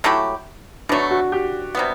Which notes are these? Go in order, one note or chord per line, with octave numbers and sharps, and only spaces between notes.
F#3 A3 E4 G4
B2 F#3 A3 D4
F#4
G4
C3 G3 B3